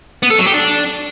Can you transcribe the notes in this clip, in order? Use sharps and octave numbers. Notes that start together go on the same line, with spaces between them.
B3
A4
F#3
G4
D4